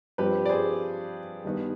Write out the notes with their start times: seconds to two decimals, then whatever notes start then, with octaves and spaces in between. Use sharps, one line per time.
0.18 G2 F3 C4 G4 B4
0.45 D5
0.49 G#4 C5
1.44 G2 D#3 B3